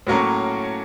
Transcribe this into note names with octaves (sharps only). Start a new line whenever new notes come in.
A2 F#3 A#3 C#4